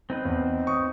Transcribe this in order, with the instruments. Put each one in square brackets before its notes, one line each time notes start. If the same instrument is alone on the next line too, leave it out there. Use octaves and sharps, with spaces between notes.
[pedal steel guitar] C4 D#4 B4
[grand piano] E2
C#6 D#6